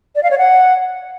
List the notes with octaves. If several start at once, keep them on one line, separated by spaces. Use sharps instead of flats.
D5
F5
C#5
F#5